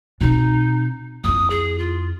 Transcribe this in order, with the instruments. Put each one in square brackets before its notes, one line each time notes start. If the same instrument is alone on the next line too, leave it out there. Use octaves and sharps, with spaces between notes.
[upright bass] B2 C4 [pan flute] D#4
[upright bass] F2 E4 [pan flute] D#6
[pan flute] G#4
F4